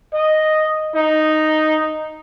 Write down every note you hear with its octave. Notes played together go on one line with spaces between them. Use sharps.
D#5
D#4